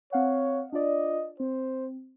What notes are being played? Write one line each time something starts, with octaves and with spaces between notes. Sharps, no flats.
C4 C#5 F5 F#5
D4 F4 D5 D#5
C4 C5